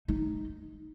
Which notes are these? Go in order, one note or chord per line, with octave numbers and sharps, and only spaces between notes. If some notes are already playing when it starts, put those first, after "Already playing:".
D#4